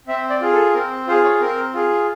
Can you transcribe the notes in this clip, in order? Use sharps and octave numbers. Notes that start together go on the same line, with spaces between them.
C4 E5
D5
F4 G#4
A4
C4 A#4
F4 G#4 C5
C#5
C4 A#4
F4 G#4